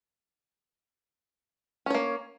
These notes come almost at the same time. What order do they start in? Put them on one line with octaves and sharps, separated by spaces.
C#4 C#5 A#3